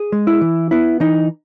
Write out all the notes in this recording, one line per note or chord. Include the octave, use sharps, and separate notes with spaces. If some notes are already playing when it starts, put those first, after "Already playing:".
Already playing: G#4
G#3
E4
E3
B3 E4
E3 D#4